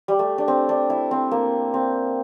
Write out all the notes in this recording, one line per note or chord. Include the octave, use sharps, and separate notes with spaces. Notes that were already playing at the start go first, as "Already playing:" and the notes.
G3
A3
D4
C4
D4
E4
C4
A#3
C4